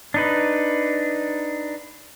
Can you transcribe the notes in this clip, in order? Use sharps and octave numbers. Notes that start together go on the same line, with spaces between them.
D4 D#4 B4